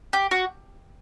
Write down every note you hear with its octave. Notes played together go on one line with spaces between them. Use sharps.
G4
F#4